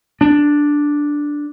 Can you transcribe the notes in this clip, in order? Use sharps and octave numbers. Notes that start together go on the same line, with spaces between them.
D4